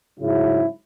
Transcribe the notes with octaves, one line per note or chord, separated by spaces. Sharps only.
G#2 C#3 F#3 E4